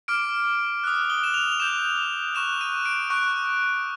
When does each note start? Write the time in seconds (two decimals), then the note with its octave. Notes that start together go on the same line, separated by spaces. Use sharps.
0.08 D6 F6 D7
0.84 D#6 F#6
1.10 G7
1.24 E7
1.34 F7
1.52 F7
1.60 D6 G6 E7
2.35 C#6 F#6 E7
2.61 D#7
2.85 D7
3.10 C#6 F#6 D7